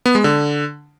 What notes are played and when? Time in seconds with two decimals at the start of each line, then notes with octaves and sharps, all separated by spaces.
0.06 B3
0.15 G#3
0.24 D3